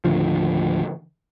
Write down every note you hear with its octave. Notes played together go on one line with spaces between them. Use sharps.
D#2 A2 D3 F3